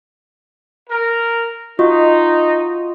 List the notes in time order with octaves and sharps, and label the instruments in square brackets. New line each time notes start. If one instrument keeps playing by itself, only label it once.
[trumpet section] A#4
[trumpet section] D#4 [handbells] F4 F#4 D#5